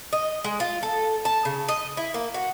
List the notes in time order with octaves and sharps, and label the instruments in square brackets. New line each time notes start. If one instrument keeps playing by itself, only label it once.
[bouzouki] D#5
G#3
F4
A4
A5
C#3
D#5
E4
A#3
F#4